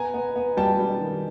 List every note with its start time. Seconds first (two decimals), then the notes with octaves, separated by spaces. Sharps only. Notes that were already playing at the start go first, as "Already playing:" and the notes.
Already playing: B3 G#5 A#5
0.14 B3
0.36 B3
0.57 G3 G5 A5
0.79 G3
1.01 D#3